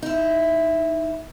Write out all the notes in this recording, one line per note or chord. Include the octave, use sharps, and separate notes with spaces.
D#4 E4